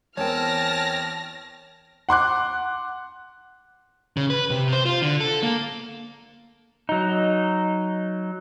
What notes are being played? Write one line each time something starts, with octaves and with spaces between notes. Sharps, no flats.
E2 C4 A#4 C#5 G5 A5 F6 A#6
F#5 C6 D6 F#6
C#3
B4
C3
C5
F4
D3
A4
A#3
F#3 D#4